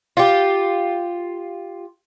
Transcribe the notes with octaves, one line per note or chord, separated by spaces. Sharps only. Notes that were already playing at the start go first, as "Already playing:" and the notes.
F4 G4